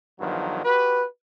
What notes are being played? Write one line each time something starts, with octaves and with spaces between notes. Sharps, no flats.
E2 G2 D#3 F3 F#3
F#4 G4 B4